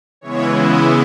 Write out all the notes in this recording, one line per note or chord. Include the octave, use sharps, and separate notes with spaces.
C#3 E3 G#3 B3 E4 C#5
D#5